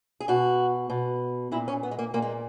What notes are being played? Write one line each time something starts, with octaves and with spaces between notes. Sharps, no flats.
G#4
B2 F#4
B2
A#2 E4
C#4
B3
G#3
A#3
A#2 A#3
G#3